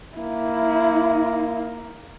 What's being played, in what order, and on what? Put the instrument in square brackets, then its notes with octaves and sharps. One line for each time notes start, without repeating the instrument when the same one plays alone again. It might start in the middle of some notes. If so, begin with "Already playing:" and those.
[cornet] A#3 [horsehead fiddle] E4